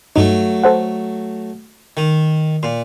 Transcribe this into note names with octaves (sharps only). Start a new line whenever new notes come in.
G2 F#3 A3 D#4
A4 C5 F#5
D#3
A#2 C6